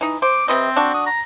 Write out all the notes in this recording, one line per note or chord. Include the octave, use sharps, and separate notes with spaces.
E3 D#4
C5 D6
C3 C4 B4 D#5
D4 F#4
D#6
A#5